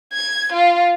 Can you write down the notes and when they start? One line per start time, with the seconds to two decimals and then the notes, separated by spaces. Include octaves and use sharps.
0.13 G#6
0.53 F4